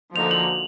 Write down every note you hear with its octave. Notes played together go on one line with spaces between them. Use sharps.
D3 F3 A#3 D#4 F#4 F7
F#7